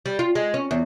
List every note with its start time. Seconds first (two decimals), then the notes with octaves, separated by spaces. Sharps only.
0.06 G3
0.19 F4
0.35 G#3
0.54 C#4
0.71 E2